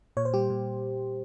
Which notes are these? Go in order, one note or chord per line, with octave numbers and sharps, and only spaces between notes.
A#2 C#5
C5
G3 G4
A#2